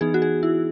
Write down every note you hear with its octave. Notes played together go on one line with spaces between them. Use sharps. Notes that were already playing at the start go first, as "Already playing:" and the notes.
E3 B3 D#4 G#4
F#4
G#4
E4